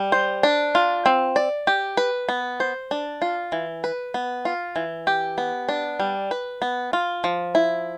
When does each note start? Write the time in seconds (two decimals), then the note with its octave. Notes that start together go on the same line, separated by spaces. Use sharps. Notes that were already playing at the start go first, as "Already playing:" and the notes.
Already playing: G3
0.12 C5
0.43 D4
0.75 F4
1.06 C4
1.36 D5
1.67 G4
1.97 B4
2.29 B3
2.60 C5
2.91 D4
3.22 F4
3.52 E3
3.84 B4
4.14 B3
4.45 F4
4.76 E3
5.07 G4
5.38 B3
5.69 D4
6.00 G3
6.31 B4
6.62 B3
6.93 F4
7.24 F3
7.55 E4